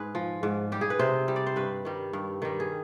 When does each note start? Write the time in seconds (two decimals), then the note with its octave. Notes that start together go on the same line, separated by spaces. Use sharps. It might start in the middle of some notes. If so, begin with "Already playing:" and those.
Already playing: G#2 G#4 B4
0.15 F3
0.43 G#2
0.72 G3 G4
0.81 G#4
0.90 B4
0.99 C3 C5
1.28 G3
1.36 D5
1.47 C5
1.56 G2 B4
1.85 D#3 G3
2.13 G2
2.42 D#3 G3
2.60 G#4